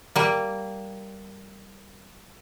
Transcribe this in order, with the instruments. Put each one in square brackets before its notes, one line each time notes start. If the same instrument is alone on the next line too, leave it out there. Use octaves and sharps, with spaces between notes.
[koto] G3 A#3